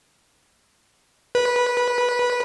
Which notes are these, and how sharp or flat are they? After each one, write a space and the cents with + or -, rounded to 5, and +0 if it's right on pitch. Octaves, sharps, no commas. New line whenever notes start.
B4 -15